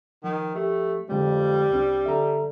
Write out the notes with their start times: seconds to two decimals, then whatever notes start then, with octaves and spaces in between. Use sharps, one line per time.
0.24 D#3 F3
0.56 A3 G4
1.09 F2 D3 G3 G#3
1.71 C2 C4 D4
2.06 D3 E5 A#5